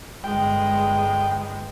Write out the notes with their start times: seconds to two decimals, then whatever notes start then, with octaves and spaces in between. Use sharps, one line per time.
0.24 G1 G#3 G5